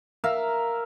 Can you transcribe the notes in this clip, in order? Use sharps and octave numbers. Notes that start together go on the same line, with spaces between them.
A#4 E5 F5 A#5